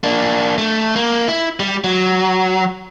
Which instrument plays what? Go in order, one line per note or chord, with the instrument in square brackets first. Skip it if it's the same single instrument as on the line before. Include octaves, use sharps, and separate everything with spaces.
[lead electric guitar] A#3 D4
A3
A#3
E4
G3
F#3